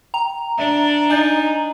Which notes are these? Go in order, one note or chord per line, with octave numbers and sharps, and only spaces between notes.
G5 A#5
D4 E5
D#4 G#5 G6 A6